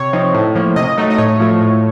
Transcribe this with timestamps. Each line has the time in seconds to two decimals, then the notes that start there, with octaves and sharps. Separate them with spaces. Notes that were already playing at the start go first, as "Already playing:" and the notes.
Already playing: C3 C#5
0.13 F3 C4 D#4
0.35 A2
0.55 F3 A#3
0.76 C3 D#5
0.97 F#3 A3 D#4
1.10 D#5
1.18 A2 C#5
1.39 F3 A3
1.60 A2